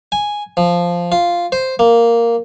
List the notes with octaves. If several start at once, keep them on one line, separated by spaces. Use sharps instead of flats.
G#5
F3
F4
C5
A#3